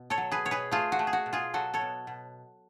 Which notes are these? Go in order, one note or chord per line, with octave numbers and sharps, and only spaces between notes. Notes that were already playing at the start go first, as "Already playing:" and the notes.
Already playing: B2
A4 C#5
F#3
G#4 B4
B2 C#5
G#4 B4
A3 F4 G#4
F#4
A3
G#4
F#4
B2
F4 G#4
F#3 F#4 A4
A4 C#5
B2
B2